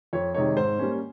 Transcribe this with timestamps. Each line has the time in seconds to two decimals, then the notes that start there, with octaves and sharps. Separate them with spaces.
0.13 F2 C#5
0.34 C3 D#3 G#3 D#4 C#5
0.57 G#2 C5
0.79 G3 A#3 C#4